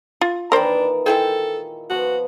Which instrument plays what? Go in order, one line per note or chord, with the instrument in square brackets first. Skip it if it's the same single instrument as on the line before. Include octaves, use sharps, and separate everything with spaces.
[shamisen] F4
[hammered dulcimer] A#2 D#3 E3 [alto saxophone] D4 [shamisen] A#4 C5 [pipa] G5 B5
[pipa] G#3 E4 G5 [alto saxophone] A4
[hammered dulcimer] B2 F3 [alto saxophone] F#4